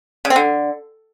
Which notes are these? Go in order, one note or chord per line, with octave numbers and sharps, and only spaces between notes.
C#3
C4
D3